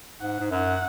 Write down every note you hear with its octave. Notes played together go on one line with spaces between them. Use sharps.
G#2 F#5
G#2
F#2 F#5